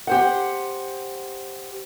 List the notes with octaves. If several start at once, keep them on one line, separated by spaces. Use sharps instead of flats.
G4 C5 F#5